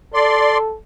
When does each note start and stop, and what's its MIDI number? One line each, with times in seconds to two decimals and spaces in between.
0.14 0.76 69
0.14 0.58 74
0.14 0.58 84